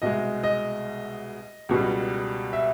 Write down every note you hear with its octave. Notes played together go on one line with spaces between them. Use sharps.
C2 B2 G#3 D#5
D#5
C#2 B2 G3
E5